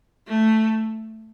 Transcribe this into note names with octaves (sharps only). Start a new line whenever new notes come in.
A3